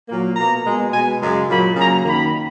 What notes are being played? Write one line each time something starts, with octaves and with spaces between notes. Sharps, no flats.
A#2 F#3 A#3
B2 A#3 A#5
B2 G#3
B2 G#3 G#5
F#2 C#3 G#3
A#2 F#3 A#3 B5
C#3 F#3 A#3 A#5
F#2 D#3 A#3 B5